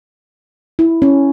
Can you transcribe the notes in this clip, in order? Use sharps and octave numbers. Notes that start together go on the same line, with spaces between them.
E4
C#4